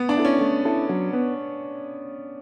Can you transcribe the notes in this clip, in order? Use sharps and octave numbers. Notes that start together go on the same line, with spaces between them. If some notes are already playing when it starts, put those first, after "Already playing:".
Already playing: B3
D4
E4 A4
C#4
A3
E4 A4
F#3
B3